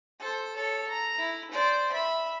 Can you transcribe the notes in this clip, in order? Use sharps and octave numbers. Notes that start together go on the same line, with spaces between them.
A4 C5
A4 C#5
A#5
E4
C5 D5
E5 B5